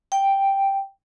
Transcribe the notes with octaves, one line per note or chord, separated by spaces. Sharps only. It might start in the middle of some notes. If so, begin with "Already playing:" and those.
G5